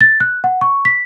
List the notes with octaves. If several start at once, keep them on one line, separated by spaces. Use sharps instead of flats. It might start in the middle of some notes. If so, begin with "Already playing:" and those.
A6
F#6
F#5
C#6
B6